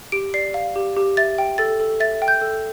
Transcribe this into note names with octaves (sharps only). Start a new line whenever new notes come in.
G4 D7
D5 C7
F5
G4
G4
E5 A6
G5
A4 A6
A4
E5 A6
G5
G6
A4